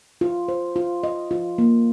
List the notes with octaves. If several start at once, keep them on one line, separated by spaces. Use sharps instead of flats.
F4
C5
F4
D#5
F4
A#3